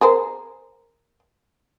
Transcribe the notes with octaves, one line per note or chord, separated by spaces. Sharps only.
G#4 A#4 C5